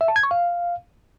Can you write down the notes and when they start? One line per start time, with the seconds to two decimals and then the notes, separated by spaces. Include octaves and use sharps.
0.01 E5
0.08 A5
0.16 G#6
0.23 C#6
0.31 F5